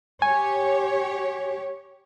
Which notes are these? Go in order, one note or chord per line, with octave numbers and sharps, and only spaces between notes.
G4 C#5 G#5